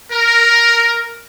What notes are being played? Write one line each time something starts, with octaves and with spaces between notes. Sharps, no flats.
A#4